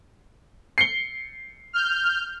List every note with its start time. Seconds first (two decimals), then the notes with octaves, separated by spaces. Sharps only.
0.78 C7 C#7 G7
1.73 F6 G6